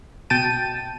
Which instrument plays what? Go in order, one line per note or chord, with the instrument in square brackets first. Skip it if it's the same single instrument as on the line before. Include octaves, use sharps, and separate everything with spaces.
[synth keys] B2 G5 A5 D#7